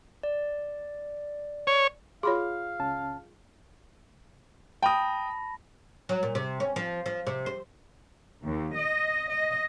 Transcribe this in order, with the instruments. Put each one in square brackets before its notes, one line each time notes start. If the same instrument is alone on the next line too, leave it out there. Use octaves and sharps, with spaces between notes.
[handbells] D5
[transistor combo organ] C#5
[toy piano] F4 G#4 [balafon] C#5 B5 C6 [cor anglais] F5
[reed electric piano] C#2 C#4 A5
[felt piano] G5 D#6 [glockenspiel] A5 B5 A#6
[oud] F#3
A#2
C3
C#4
F3
F3
C3
C5
[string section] D#2
D#5
D#5